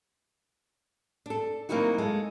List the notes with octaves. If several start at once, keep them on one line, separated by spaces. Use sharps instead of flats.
D4 A4
F#3 A#3 C4 D#4 E4 F#4
G#3 A4